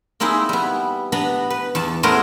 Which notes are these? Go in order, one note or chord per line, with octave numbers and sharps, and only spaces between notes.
A#3 C4 D#4 E4 G#4
G3 B3
B3 D4 B4 A#5 B5
B4
E2 A5
G#3 A3 B3 C#4 A#4 C5